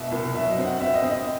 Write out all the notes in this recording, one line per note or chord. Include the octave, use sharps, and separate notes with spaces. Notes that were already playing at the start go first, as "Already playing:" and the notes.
Already playing: C2 B2 E5
C2
F#3 E5
D#5
C4
F#5
C4 E5
D#5
C4
D#5